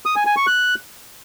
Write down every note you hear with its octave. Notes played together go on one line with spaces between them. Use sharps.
D#6
G#5
G#5
C#6
F#6